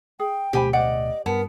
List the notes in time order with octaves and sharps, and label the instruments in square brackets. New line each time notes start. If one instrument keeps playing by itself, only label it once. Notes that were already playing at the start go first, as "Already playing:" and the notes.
[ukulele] G#4 [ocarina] G5
[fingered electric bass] D1 B2 A3 [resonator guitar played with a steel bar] G4 [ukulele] C5 G#5 B5
[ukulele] C5 F#5 [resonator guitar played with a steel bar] D5 [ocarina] D#5
[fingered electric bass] G2 [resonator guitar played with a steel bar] B3 [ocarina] A#4 [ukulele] A5